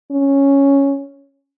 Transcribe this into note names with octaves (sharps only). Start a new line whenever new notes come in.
C#4